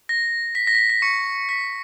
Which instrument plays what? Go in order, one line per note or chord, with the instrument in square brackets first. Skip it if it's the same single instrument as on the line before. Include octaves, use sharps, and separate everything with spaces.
[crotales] A#6
B6
A#6
B6
A#6
B6
C#6 C#7
B6